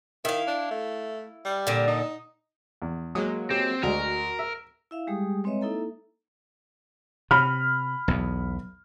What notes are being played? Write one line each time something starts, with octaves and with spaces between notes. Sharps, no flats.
D#3 E4 F5
D4
A3
G3
A#2 D3
D#4
E2
F#3 G#3 A#3 D#6
C4 G4
D2 G#3 F#4 A#4
E5
E4 E5 F5
G3 G#3 G4 G#4 D#6
G#3 C4 B4 C#5 D#5 E5
A#3 D#4 E4 A4 E5 A#5
C3 B5 F6
B1 E2